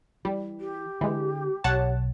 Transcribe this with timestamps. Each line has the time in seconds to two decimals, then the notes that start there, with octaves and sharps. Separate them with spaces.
0.25 E3 G3
0.61 G4
1.01 D3 E3 G#3
1.64 B1 C#5 F#5 A5